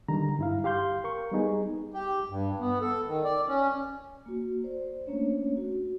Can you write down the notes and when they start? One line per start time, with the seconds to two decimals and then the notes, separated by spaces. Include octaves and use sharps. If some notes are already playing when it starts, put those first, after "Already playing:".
0.08 D3 D#3 G3 A#5
0.39 G2 E4 F5
0.64 G4 F5 C6 G6
1.04 A#4 C#6
1.32 G3 B3 D#4 G#4
1.94 G4
2.30 G2
2.60 B3
2.81 A4
3.07 D#3
3.24 D5
3.47 C#4
4.26 A#3 F#4
4.64 C5 D5
5.06 A3 A#3 C#4 D4 C#5
5.57 F#4